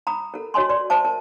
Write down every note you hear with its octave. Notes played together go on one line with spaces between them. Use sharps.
A#5 B5 D#6
A4 A#4
F#4 C#5 D#5 G#5 C6
B4 D5 C6
C5 E5 A5 D6
A#4